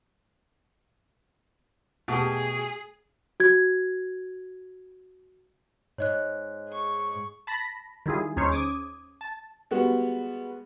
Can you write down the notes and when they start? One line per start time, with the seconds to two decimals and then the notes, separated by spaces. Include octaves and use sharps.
2.08 B2 A3 G4 G#4
3.40 F#4 G#6
5.98 G#2 C#5 D#5 F#6
6.68 G#4 C#6
7.47 A5 B5 A#6
8.06 D#3 G3 E4 F4 G#4
8.36 D#2 C#4 D#4 G#4 C5 C#5
8.52 D6 D#6 G#6
9.21 A5
9.71 G3 G#3 B3 F#4